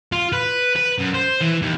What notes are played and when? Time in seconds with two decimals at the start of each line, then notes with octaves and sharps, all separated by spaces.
0.12 F4
0.33 B4
0.76 B4
0.98 F#2
1.14 C5
1.41 E3
1.62 D#2